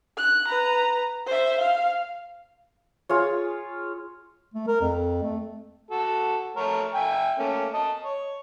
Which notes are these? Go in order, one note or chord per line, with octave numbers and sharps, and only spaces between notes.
F#6
B4 A#5
C5 E5
F5
F4 G#4 C#5
A3
A#4
F2
A3
F#4 A4
A3 A#4 C#5
E5 G5 G#5
A3 A#3 C#4
D#5 A5
C#5